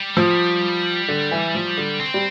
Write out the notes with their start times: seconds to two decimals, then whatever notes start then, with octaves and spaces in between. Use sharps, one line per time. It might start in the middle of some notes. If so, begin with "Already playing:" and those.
Already playing: G3
0.17 F3
1.08 D3
1.31 E3
1.55 F3
1.78 D3
2.00 C4
2.14 G3